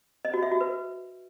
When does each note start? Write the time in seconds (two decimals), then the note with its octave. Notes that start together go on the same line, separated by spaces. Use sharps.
0.25 D#5
0.34 F#4
0.43 E5
0.52 F#4
0.61 B4